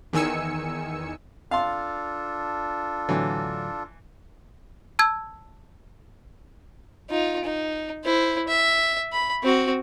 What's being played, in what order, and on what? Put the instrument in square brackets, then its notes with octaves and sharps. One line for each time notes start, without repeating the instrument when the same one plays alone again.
[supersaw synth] E2 D#3 G#5 E6 C#7
[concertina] D4 F4 A4 [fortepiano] F5 C6
[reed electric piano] A2 D3 F#3 [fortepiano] E3
[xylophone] A5 E6 G#6
[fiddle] D#4 F4
D#4
E4 C5
E5
B5
C4 F#4